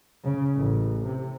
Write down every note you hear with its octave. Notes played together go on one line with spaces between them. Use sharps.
C#3
A1
C3